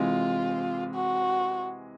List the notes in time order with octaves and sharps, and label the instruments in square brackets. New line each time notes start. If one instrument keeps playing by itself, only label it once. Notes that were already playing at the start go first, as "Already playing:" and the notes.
Already playing: [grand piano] C3 E3 G#3 [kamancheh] F4
[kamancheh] F#4